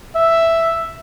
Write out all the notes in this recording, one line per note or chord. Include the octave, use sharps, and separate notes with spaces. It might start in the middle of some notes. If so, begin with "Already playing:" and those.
E5